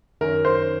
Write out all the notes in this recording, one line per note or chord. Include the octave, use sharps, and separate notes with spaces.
F#2 D#3 A#4
C5